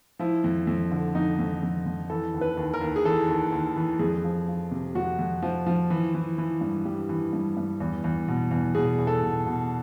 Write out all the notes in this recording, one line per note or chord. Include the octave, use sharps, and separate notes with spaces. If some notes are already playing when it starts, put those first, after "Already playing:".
F3 E4
F2
F2
D3
F2 D#4
F2
F2
F2
E3 A4
D#2
B4
D#2
A#4
D#2
G#4
E3 A4
D#2
D#2
E3
F2 G#4
F3
F3
C3
F2 F#4
F2
F3
F3
E3
E3
E3
G2
G2 G4
E3
G2
G2
E2
E2
B2
E2
B2 G#4
E2
A4
B2
B2